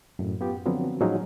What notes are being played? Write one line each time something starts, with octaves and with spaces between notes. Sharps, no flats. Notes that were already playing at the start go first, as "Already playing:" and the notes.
F#2 A2
B3 F4 G4
D3 F3 F#3 B3 C4
A2 F3 F#3 G#3 C#4 D#4